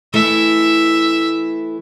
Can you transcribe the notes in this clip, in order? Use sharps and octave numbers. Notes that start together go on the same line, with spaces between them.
E3 A3 E4 E5